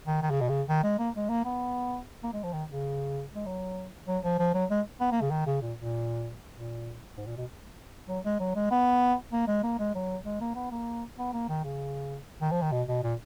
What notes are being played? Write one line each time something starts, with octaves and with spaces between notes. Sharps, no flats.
D#3
D#3
C#3
B2
C#3
D#3
G#3
A#3
G#3
A#3
B3
A#3
G#3
F3
D#3
C#3
G#3
F#3
F#3
F3
F3
F#3
G#3
B3
A#3
C#3
D#3
C#3
A#2
A#2
A#2
G#2
A#2
B2
F#3
G#3
F#3
G#3
B3
A#3
G#3
A#3
G#3
F#3
G#3
A#3
B3
A#3
B3
A#3
D#3
C#3
D#3
F3
D#3
B2
B2
A#2